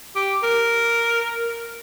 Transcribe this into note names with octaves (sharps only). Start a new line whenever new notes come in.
G4
A#4